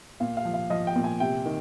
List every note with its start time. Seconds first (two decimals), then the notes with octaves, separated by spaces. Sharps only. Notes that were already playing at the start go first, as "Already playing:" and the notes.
0.20 A#2 F5
0.37 F5
0.45 F3
0.54 F5
0.70 F3 D#5
0.87 G5
0.96 A#2
1.04 G#5
1.20 C3 G5
1.46 D#3